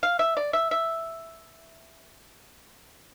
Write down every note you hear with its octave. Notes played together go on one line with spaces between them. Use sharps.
F5
E5
D5
E5
E5